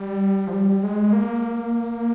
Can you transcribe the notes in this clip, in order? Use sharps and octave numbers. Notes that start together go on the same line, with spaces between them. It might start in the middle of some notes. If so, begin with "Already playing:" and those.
Already playing: G3
F3
G3
G#3
A#3